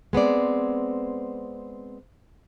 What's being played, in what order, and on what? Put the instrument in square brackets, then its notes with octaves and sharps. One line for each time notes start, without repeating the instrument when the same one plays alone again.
[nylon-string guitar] G#3 B3 C4 D5